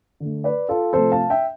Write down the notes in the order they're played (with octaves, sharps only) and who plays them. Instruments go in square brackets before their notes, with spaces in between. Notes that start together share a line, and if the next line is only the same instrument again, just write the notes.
[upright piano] D3 A3
B4 D5
F4 A4
C3 F3 A3 A4 C5
F5 A5
E5 G5